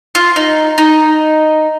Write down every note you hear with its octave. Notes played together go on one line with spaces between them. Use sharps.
F4
D#4
D#4